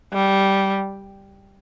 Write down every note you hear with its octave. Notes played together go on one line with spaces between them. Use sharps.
G3